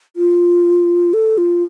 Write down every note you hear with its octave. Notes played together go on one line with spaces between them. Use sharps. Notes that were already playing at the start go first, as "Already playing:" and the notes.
F4
A4
F4